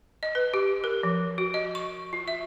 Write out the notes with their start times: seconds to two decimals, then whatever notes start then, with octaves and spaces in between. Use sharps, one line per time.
0.23 D#5
0.35 B4
0.54 G4
0.84 A#4
1.03 F3
1.38 F#4
1.54 D#5
1.75 C#6
2.13 F4
2.28 E5